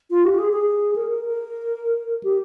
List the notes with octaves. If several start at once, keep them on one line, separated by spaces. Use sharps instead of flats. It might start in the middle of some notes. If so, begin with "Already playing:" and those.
F4
G4
G#4
G#4
A#4
A#4
A#4
G4